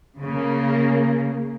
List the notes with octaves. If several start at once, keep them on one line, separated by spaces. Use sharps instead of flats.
C#3 A#3